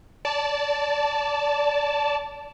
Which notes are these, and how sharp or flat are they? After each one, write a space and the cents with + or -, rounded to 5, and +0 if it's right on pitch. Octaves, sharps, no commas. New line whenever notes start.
D5 -20 A5 +0